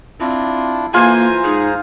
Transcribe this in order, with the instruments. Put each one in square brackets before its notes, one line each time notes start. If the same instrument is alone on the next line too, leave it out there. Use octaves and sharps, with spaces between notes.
[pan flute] C4 [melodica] D4 E4 F4
[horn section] E3 A4 G#5 [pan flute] A#3 [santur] F4 [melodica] C5 A#5
[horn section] G#2 G#4 [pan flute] D#4